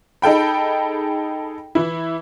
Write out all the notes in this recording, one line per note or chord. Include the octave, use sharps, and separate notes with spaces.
D#4 G#4 A4 G5 B5
E3 E4